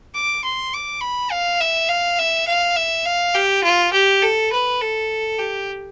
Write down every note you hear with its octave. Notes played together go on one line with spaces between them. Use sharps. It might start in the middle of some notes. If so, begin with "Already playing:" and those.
D6
C6
D6
B5
F5
E5
F5
E5
F5
E5
F5
G4
F4
G4
A4
B4
A4
G4